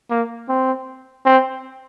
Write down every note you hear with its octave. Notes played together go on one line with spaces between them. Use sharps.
A#3
C4
C4